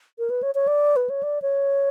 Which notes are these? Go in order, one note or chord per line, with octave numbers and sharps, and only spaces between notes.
A#4
B4
C#5
C#5
D5
B4
C#5
D5
C#5